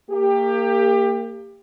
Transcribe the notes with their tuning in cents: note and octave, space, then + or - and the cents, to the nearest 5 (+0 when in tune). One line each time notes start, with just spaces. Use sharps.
A#3 -25 G4 +25